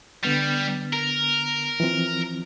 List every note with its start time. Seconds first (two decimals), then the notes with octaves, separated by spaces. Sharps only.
0.23 D3 G3 B3 A6
0.93 A#4
1.80 E3 F3 C4